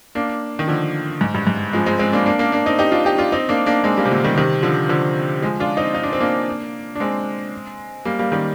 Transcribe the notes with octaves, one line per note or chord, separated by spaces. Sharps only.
A#3 D4
D#3
D3 F3
G#2
G2
G#2
F3 G#3
G#3 C4
G#3 C4
A#3 D4
A#3 D4
A#3 D4
A#3 D4
C4 D#4
D#4 G4
D4 F4
D#4 G4
D4 F4
C4 D#4
A#3 D4
A#3 D4
G#3 C4
G3 A#3
C3
A#2 D3
D#3 G3
C3 D#3
D3 F3
D3 F3
F3 G#3
D4 F4
C4 D#4
D#4
D4
C4
A#3 D4
D4
G#3 C4
G3 A#3
G3 A#3
D#3 G3